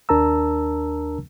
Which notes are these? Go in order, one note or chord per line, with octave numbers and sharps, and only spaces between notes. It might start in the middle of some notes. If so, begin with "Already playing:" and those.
D#2 D4 A#4 A5 A#5 E6